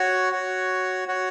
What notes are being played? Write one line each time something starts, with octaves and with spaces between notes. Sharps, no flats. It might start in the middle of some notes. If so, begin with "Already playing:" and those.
Already playing: F#4 C#5 F#5
F#4 C#5 F#5
F#4 C#5 F#5